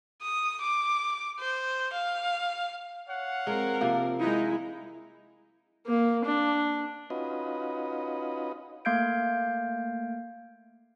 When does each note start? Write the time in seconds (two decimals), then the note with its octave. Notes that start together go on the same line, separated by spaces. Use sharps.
0.22 D#6
0.61 D6
1.39 C5
1.93 F5
3.08 C#5 F5 F#5
3.47 G#3 C4 A#4
3.81 C3 F3 A#3
4.19 G#3 D#4 E4
5.87 A#3
6.25 D4
7.10 C#4 D#4 F4 F#4 B4 D#5
8.85 A3 A#3 F5 G6 G#6 D7